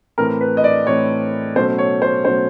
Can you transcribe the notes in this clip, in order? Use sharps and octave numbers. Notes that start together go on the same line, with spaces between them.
A2 E3 A3 C4 A#4
B4
D#5
D5
A2 E3 A3 C4 C#5
B2 F#3 A3 C#4 C5
C#5
C5
B2 F#3 A3 C#4 C5